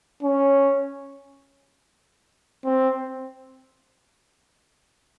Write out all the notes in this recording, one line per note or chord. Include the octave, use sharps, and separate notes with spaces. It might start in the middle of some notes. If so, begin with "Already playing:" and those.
C#4
C4